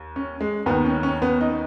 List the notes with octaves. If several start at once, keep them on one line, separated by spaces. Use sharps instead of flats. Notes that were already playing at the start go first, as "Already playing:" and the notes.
Already playing: D#2
C#4
G#3
D#2 D#3 B3
C#4
C#4
B3
D#4